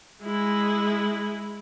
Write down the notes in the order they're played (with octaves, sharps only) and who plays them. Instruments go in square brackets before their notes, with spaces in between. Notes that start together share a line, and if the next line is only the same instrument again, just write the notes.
[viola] G#3 E4